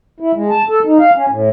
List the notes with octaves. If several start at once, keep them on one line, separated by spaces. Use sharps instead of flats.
E4
G#3
A5
A4
D#4
F5
C#4
A2